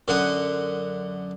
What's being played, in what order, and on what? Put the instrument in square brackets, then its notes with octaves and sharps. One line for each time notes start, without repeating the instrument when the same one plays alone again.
[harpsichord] F#2 D3 F#5 D#6